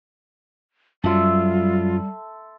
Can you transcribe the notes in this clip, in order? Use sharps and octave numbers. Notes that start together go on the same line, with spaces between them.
F#2 F#3 G3 F4 A4 E5 C6